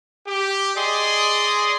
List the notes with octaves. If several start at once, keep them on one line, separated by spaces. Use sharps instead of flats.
G4
G#4 D5 D#5 C6